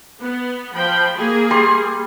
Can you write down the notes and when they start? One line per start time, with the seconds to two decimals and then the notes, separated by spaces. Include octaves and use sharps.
0.21 B3
0.75 F3 G5 B5
1.15 A#3 G#4
1.50 G3 C6